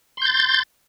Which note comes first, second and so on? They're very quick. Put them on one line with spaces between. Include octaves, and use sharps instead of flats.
C6 G6 A6